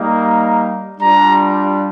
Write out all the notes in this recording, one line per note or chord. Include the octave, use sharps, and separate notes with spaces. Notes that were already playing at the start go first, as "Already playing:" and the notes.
Already playing: G3 A#3 D#4
G3 D4 F4 A#5